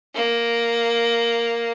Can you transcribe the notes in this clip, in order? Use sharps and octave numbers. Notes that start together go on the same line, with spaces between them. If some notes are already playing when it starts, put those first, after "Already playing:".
A#3